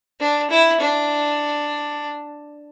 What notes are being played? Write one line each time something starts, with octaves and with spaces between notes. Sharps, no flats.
D4
E4
D4